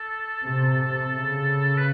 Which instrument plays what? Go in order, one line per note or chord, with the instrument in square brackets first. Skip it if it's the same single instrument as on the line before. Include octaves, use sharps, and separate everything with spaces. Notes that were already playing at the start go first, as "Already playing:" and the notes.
Already playing: [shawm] A4
[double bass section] C3
C#3
[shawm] B4